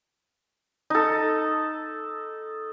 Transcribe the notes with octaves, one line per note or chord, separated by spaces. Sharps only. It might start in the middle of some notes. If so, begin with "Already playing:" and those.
D#4 A4